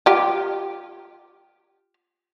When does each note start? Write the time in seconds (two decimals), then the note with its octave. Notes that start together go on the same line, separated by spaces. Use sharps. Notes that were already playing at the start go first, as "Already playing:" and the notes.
0.06 F4 G4